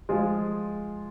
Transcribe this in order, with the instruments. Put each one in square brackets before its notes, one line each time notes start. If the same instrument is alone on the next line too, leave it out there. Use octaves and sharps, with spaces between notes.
[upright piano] F3 G#3 F4 G#4